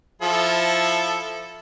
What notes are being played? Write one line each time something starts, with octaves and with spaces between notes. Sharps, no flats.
F3 E4 A4